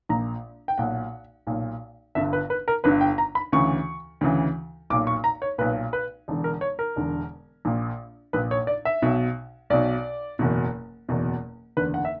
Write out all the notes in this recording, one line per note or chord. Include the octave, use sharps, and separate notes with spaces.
A#1 A#2 A#5
G5
B1 A#2 F#5
B1 A#2
G1 G2 D3 E5
B4
B4
A#4
G1 G2 D3 B4
G5
A#5
B5
D2 C#3 E3 C#6
D2 C#3 E3
B1 A#2 D6
C#6
A#5
C#5
B1 A#2 B4
B4
E1 E2 D3
A#4
C#5
A#4
E1 E2 D3
A#1 A#2
A#1 A#2 B4
C#5
D5
E5
B1 B2
B1 B2 D5
F#1 E2 B2
F#1 E2 B2
F#1 E2 D3 B4
F#5
E5